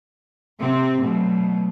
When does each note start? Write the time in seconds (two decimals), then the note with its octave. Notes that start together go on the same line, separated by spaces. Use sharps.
0.60 C3 C4
1.02 B2 F#3 A3